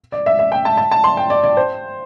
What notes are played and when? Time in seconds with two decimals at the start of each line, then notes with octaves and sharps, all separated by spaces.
0.12 D5
0.26 E5
0.39 E5
0.52 G5
0.65 A5
0.77 A5
0.91 A5
1.04 C6
1.17 G5
1.30 D5
1.43 D5
1.57 C5